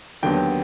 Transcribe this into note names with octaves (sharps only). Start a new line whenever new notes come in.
D#2 D3 F#3 B3 G5